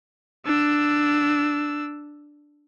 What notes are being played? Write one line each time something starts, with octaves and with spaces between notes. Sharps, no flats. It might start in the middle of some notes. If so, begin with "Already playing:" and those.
D4 E6